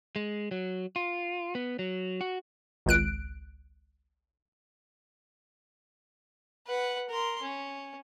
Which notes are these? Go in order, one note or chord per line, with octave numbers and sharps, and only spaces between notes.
G#3
F#3
F4
B3
F#3
F#4
G#1 C#2 F#6 D7
B4 F#5
A#4 C6
C#4